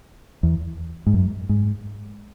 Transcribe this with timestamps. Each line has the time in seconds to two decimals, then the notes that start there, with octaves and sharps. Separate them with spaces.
0.43 E2
1.07 G#2
1.14 F#2
1.49 G#2